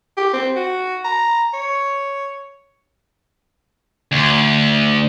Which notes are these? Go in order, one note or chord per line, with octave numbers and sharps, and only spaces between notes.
G4
C4
F#4
A#5
C#5
D2